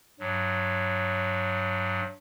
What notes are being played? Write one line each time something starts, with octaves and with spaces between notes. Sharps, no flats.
G2 F#3